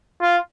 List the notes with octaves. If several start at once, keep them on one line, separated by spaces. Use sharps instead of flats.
F4